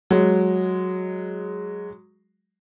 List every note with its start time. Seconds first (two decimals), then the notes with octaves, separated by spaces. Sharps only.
0.11 F#3 G#3